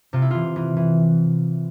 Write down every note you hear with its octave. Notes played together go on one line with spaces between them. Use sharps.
C3 F4
E4
E3 F4
E3
E3